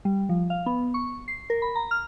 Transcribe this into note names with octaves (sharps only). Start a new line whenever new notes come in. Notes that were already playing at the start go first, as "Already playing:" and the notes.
G3
F3
F5
B3
C#6
C7
A#4
B5
A#5
F6